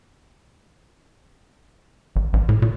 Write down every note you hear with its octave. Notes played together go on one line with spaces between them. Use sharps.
G#1
A1
A2
A#2